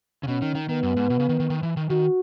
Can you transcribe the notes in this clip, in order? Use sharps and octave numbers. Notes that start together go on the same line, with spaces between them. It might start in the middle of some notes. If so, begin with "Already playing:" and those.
C#3
B2 C#4
D#3
D#3
D#3 B3
F#2
G#2
B2
C#3
D#3
D#3
D#3
E3
D#3
D#3 F#4